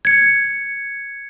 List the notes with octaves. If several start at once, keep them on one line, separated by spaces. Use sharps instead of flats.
G#6 C#7